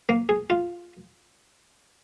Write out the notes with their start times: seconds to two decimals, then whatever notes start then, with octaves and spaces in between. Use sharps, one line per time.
0.09 A#3
0.29 G#4
0.50 F4